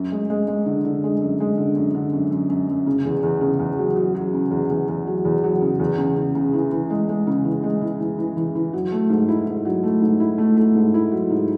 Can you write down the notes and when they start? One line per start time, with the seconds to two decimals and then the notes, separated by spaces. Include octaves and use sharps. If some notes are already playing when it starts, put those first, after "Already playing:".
Already playing: F#2
0.12 G#3
0.30 G#3
0.48 G#3
0.66 D3
0.85 D3
1.04 G#3
1.22 F#2
1.40 G#3
1.58 D3
1.76 F#2
1.94 D3
2.13 F#2
2.31 F#2
2.50 F#2
2.68 F#2
2.86 C#3
3.05 E2
3.23 E2
3.41 C#3
3.59 E2
3.78 F#3
3.96 F#3
4.15 F#3
4.34 C#3
4.51 E2
4.70 E2
4.88 E2
5.07 F#3
5.25 E2
5.44 F#3
5.61 C#3
5.80 E2
5.98 C#3
6.16 C#3
6.35 C#3
6.54 E3
6.72 E3
6.90 G#3
7.09 G#3
7.27 C#3
7.45 E3
7.63 G#3
7.81 E3
8.00 E3
8.19 E3
8.37 E3
8.55 E3
8.73 F#3
8.92 A3
9.10 G#2
9.28 E4
9.47 G#2
9.65 F#3
9.83 A3
10.02 G#2
10.20 E4
10.38 A3
10.57 A3
10.75 G#2
10.94 E4
11.12 F#3
11.30 G#2